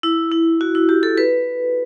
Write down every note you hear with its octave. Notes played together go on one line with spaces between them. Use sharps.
E4
E4
F#4
E4
G4
A4
B4